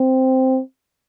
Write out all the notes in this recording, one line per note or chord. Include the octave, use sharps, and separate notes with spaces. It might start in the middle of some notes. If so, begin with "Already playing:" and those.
Already playing: C4